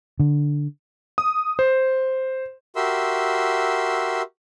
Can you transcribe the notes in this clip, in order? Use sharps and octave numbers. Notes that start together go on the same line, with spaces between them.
D3
D#6
C5
F#4 G4 A#4 E5 C6 E6